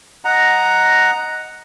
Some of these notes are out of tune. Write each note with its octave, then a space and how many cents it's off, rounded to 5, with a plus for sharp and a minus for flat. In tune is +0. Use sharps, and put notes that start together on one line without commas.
D#5 +0 F#5 +0 A#5 +0